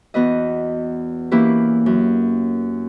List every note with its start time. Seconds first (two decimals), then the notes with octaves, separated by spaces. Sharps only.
0.14 E2 B3 F#4 B4 D#5
1.31 E3 A#3 C#4 E4 G4 B4
1.86 F#2